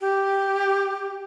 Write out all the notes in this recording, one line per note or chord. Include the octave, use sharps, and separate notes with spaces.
G4